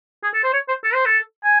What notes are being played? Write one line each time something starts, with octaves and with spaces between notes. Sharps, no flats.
G#4
A4
C5
C#5
C5
A4
C5
A4
G#5